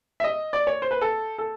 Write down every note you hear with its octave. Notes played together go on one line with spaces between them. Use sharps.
E5
D#5
D5
C#5
C5
B4
A4
A4